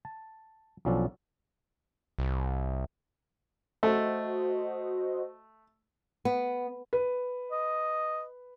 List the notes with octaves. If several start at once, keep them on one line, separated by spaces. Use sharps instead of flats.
A5
B1 F3 C#4 D4 A4
C2
A3 F#4 C5 D#5
B3
B4
D#5